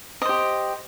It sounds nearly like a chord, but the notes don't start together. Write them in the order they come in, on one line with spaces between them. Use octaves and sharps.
D#5 C5 G4